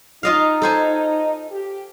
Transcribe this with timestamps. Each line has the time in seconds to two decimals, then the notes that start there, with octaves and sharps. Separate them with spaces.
0.23 D#4 F4 D#5 F5
0.62 A4 C5 G#5
1.51 G4